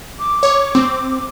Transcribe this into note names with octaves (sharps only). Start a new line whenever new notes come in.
D6
C#5
C4